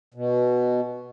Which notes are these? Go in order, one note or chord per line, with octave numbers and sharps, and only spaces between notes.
B2